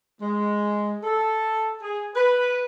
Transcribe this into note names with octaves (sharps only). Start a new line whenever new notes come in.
G#3
A4
G#4
B4